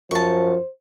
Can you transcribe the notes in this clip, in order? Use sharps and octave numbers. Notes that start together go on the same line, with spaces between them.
F#2 F3 C5 A5 C#6